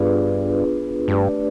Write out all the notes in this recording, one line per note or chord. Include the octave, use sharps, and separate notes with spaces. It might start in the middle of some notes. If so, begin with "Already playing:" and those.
Already playing: G2 B3 D4 F4 G#4 B4
G2 A3 D4 G4 B4 D5